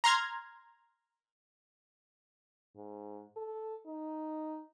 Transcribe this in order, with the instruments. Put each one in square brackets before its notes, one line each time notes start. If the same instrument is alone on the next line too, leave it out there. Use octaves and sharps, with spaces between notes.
[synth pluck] A#5 C6 F6 G#6
[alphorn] G#2
A4
D#4